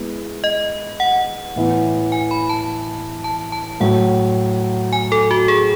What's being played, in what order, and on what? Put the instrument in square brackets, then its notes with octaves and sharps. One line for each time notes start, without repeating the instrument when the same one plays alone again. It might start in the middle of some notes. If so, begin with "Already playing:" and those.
Already playing: [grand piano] G#3 B3 E4
[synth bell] D#5
F#5
[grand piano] A2 E3 B3 E4
[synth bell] G#5
B5
A5
A5
A5
[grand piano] A2 F#3 A3 [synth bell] F#5
[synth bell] G#5
A4
F#4
G#4